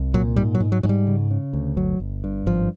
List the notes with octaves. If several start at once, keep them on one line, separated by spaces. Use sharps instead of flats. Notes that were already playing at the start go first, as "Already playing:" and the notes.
Already playing: C2
A#2 F#3
G#2 G3
F#3
G#2
F#3
G#2 F#3
G3
C#3
C#3
D2
G1 F#3
G1
G2
G#1 F3